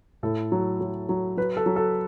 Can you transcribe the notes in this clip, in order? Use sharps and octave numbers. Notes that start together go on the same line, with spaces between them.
A2 A4
F#3
F#3
F#3
F#3 B4
A4
F#3
A4